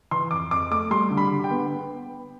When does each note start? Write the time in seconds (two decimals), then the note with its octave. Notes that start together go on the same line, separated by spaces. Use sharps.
0.11 E3 C6
0.31 F2 D6
0.51 F2 D6
0.71 A3 D6
0.91 G3 C6
1.11 D3
1.17 B5
1.31 D3
1.44 G5
1.51 B3